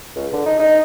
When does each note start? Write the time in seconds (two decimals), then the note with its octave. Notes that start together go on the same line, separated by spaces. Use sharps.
0.15 C#2
0.33 D3
0.46 D#4
0.59 D#4